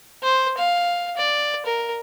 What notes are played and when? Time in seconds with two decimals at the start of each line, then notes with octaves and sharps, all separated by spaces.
0.23 C5
0.58 F5
1.17 D5
1.66 A#4